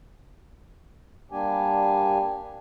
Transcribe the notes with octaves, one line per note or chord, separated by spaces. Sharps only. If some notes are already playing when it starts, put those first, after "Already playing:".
G3 A#3 D4 G4 G#5